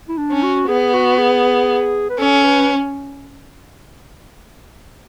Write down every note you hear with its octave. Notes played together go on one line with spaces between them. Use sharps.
E4
D4
C#4
F#4
B3 G#4
F#4
G#4
B4
C#4 A4
B4